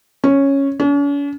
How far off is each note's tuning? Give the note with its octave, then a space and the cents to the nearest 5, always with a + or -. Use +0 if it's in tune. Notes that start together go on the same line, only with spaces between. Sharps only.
C#4 -5
C#4 +45